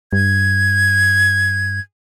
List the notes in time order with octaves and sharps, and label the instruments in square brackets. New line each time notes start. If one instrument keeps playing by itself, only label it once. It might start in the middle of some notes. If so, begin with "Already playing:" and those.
[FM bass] G2 [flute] G#6